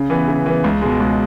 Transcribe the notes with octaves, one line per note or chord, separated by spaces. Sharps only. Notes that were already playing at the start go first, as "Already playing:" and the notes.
Already playing: C#3
E3 B3
C#3
E3 B3
C#2
B2 G#3
C#2